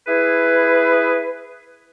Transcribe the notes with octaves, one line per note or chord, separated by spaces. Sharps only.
E4 G#4 B4